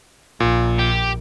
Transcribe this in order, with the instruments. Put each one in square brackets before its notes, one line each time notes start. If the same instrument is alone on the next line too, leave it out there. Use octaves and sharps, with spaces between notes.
[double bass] A#1 [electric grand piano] A#2
[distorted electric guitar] G4